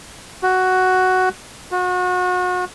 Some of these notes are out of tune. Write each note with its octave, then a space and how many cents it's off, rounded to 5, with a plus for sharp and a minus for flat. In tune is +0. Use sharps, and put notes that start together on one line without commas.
F#4 +5
F#4 -35